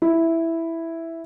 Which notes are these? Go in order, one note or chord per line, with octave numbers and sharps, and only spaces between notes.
E4